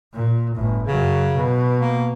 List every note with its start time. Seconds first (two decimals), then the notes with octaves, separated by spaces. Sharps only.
0.14 A#2
0.55 G1 A2
0.87 F#2 C#3 F#3
1.35 B2
1.81 A#3